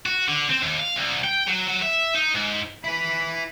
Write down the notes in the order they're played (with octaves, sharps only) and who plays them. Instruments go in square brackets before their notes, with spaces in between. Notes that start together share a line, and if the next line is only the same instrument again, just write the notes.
[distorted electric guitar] F#4
D3
C4
D#2
F5
C2
G5
F#3
F#3
E5
D#4
G#2
[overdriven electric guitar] E4 B4 [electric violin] B5